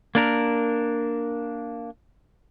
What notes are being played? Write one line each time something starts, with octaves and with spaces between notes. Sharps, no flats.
A#3 D4 A#4